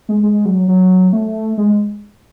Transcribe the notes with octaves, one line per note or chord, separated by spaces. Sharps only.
G#3
G#3
F#3
F#3
A3
G#3